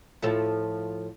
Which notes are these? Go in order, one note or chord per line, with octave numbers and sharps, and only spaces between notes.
A2 F3 A4